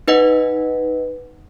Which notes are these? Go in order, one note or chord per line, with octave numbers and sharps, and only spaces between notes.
D#4 B4 D#5 F#5